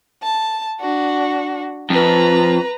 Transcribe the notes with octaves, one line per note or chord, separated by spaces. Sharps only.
A5
D4 F#4
F2 B4 A#5